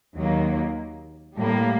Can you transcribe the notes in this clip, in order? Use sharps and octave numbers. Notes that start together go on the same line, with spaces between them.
D#2 D#3 F#3 A#3
A2 G3 A#3